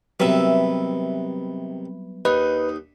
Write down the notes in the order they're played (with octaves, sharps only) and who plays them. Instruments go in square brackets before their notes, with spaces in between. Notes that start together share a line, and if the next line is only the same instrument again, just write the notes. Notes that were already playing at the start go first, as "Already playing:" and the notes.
[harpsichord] C3 D#3 [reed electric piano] F#3 G3 B3 [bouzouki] B4 E5
[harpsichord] D#2 [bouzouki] D#4 [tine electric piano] B4